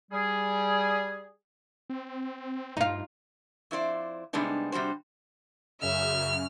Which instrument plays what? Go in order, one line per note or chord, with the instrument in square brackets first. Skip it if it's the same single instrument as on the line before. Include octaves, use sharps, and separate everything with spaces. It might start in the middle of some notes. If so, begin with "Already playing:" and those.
[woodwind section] G3 G#4
[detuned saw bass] C4
[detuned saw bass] G2 [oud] D#4 F4
[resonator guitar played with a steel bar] F2 E4 C5 D5
C3 G3 G#3 B3 D4 D#4
C3 G3 D4 F#4 C5
[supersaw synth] F#2 C#3 [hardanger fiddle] E5 [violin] F6